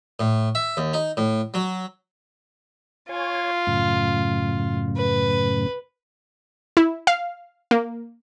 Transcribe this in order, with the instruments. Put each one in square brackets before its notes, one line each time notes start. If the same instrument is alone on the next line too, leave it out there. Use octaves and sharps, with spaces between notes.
[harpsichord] A2
E5
D#2
D#4
A2
F#3
[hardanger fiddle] F4 [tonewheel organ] C#5 G#5
[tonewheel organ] F#2 A2 C#3
[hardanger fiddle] B4
[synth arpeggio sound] E4
F5
A#3